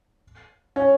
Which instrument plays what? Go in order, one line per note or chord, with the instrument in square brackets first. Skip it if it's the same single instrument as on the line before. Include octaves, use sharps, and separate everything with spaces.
[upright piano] C#4